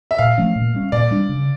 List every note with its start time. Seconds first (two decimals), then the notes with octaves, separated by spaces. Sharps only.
0.11 E5
0.18 A#2 F5
0.38 F3 A3 C#4
0.56 A#2
0.74 G3 C#4
0.92 A#2 D5
1.11 G3 D4
1.29 C#3